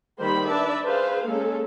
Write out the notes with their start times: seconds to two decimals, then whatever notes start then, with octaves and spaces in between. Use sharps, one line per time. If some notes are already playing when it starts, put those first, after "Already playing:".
0.17 D#3 G3 A#3 G4 C5 B5
0.47 D4 B4 D5 E5 A5
0.85 G#4 B4 C5 F5
1.25 G#3 A#3 C#4 A4